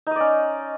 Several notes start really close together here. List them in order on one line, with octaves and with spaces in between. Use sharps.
D#4 D#5 D5 C#4